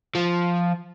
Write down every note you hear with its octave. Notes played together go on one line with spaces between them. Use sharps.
F3